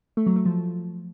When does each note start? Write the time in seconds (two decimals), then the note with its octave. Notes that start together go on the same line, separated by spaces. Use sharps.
0.17 A3
0.27 F#3
0.36 A3
0.46 F3